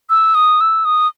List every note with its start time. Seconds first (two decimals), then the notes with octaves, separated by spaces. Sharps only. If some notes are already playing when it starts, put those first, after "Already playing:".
0.10 E6
0.35 D#6
0.61 E6
0.85 D#6